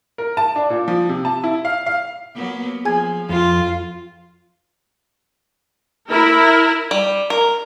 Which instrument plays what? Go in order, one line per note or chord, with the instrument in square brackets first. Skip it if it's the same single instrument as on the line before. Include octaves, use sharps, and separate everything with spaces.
[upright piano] A#4
A5
D4
A#2
F3
C3
A5
E4
F5
F5
[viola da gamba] F#3 A#3 B3
[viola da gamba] F3 [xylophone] G#4 G#5 G#6
[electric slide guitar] F2 [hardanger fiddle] F4
[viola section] E4 A#4
[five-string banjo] G3
A#4